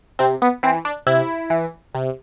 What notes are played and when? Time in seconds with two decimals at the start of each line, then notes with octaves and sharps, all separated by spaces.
0.19 C3 C4
0.42 B3
0.63 E3 C4
0.85 D4
1.07 C3 E4
1.50 E3
1.95 C3